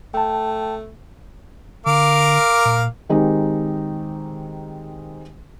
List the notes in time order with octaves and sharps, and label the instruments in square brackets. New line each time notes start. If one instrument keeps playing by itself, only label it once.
[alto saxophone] A3 [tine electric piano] G5 A5
[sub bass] D3 [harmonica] A#4 F5 D6
[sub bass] A#2
[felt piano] D#3 G#3 C4 D#4 G4